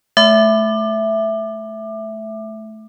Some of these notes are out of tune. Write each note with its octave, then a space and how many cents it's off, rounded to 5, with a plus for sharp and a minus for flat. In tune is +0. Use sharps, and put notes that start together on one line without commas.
A3 -20 E5 +0 D6 +25